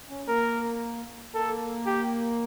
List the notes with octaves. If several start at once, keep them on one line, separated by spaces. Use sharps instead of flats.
C#4
A#3 A#4
A#3 A4
G4